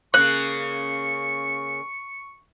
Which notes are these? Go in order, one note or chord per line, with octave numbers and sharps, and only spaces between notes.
C#3 A#3 C#6 F#6